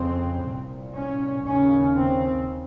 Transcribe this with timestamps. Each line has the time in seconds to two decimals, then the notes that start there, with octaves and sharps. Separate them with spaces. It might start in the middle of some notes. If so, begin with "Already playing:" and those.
Already playing: F2 C#3 C4
0.46 C2 A#2
0.96 C#4
1.45 D#2 C#3 C#4
1.96 C4